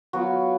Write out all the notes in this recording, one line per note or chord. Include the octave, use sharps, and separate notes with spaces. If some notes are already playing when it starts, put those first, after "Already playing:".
F#3 B3 F4 F#4